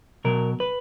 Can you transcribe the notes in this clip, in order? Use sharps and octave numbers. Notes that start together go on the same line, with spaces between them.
B2 F#3 A#4
B4